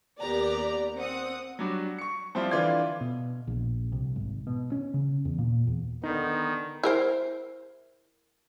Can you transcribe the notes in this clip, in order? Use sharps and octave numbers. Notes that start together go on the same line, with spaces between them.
D#2 B3 G4 A#4 D5 A#5
C4 F#5 D#6
F#3 G3 D4 F#4
C#6 C#7
F3 G3 C4 E4 F4
D3 E3 F4 D5 G#6
B2
A#1
C2
G#1
B2
C#4
C#3
E2
A#2
E2
D3 D#3 B3 D#4
E4 A#4 C5